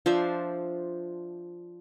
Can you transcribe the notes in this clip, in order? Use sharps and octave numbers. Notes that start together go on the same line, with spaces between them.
F3 D4 C5 E5